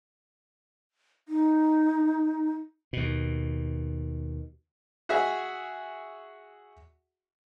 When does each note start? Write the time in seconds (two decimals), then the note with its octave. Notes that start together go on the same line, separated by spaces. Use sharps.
1.29 D#4
2.93 D#2 B2
5.09 F#4 G#4 E5